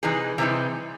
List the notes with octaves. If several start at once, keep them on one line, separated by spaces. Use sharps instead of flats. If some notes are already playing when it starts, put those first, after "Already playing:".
C3 E3 G3 D#4 G#4
C3 E3 G3 C4 D#4